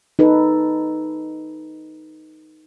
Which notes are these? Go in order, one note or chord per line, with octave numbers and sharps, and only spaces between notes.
D#4 A4 B4